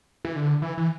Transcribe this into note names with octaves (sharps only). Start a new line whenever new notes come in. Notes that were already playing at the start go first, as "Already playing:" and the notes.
E3
D3
E3
E3